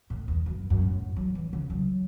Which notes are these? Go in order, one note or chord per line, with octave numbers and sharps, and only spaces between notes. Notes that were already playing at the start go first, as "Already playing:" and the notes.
A2
E2
F#2
F#2
A2
F#3
E3
C#3
F#3